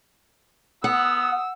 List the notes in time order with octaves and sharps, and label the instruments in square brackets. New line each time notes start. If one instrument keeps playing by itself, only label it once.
[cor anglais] B3 [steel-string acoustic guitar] F#5 [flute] D#6 [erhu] E6